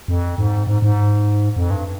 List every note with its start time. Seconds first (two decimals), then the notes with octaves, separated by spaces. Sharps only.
0.08 F2
0.38 G#2
0.67 G#2
0.82 G#2
1.57 F2
1.71 G2